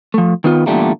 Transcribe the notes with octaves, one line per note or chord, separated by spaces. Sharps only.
F3 A3
D#3 B3 F4
E2 A#2 D3 G3 A3 A#3